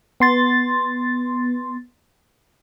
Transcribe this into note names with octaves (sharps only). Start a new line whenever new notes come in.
B3 C6 A6